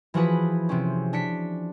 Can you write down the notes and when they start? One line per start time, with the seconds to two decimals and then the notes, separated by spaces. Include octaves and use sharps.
0.14 E3 F3 F#4 G#4 B4
0.69 C3 C4 C#4
1.13 D4 B6 C#7